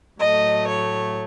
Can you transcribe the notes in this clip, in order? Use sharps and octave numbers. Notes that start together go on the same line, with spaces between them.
A2 F#3 A3 D#5
C#5